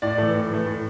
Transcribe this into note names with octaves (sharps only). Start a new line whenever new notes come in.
A2 D5
E3 A3
A2
E3 A3
A2